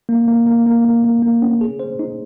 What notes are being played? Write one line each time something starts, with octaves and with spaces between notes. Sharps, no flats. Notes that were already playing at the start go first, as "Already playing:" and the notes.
A#3
A#3
A#3
A#3
A#3
A#3
A#3
C#4
G#4
C5
D#4